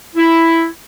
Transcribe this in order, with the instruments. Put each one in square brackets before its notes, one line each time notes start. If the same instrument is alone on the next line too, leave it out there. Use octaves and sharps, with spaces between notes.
[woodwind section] E4